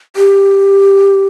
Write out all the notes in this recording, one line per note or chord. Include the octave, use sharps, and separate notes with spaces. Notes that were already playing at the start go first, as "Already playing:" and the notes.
G4